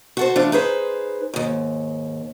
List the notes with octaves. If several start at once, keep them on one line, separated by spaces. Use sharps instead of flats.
F#4 A4 C5
E3 A3 D4 F4
D#4 G#4 B4 C5
D#2 G#2